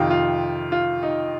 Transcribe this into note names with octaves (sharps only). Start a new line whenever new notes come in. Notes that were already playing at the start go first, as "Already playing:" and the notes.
Already playing: F2 C3 D#3 F4
F4
F4
D#4